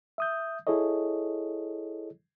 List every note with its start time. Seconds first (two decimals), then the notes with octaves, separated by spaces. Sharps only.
0.18 E5 D#6 G6
0.67 E4 G#4 A4 C#5 D#5